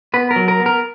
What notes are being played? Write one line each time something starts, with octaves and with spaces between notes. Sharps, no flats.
B3 B4
A#4
F#3
A#4
B3
A#4